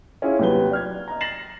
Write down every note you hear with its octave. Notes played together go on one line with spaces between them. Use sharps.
C#4 E4 F4 G#4 C#5
D#2 C3 F#3 B4 G7
D5 F6 G#6
D#5 A#5
A6 A#6 C7 E7 F#7